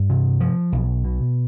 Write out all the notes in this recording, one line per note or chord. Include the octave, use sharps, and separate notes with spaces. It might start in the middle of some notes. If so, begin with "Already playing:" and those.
Already playing: G2
C3
F3
B1
B2